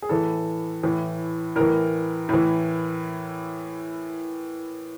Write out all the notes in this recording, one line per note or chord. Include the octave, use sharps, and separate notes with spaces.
G#4
A2 E3 A4
A2 E3
A2 E3 A#4
A2 E3